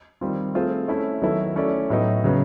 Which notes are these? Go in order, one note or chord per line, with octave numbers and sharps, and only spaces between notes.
D#3 G3 C4 F4
A3 C4 F4 G#4 C5
A3 C#4 E4
D#3 F#3 B3 E4 A4
A3 C#4 E4 A4 D5
A2 F#3 B3 D#4
C#3 F#3 B3